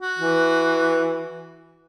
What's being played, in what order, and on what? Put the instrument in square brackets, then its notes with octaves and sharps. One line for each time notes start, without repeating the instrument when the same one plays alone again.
[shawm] F#4
[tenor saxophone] E3